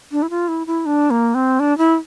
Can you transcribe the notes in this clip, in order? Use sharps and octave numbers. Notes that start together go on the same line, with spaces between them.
D4
E4
F4
E4
E4
D4
A#3
C4
D4
E4